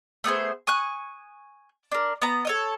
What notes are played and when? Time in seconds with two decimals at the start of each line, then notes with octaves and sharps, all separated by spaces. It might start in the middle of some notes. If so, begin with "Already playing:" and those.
0.24 A3 B3 G#4 C5
0.67 G#5 C#6 D#6 F#6
1.92 D4 A#4
2.22 B3 A#5
2.45 A4 C#5 D#5